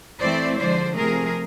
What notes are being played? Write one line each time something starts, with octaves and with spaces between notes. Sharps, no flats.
E3 A3 C4 E4 C5 D5
D3 F3 G#3 C5 D5
C3 F3 A3 G#4 A#4